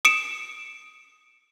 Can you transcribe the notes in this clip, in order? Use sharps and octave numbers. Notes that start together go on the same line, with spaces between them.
D#6 C#7 D7 E7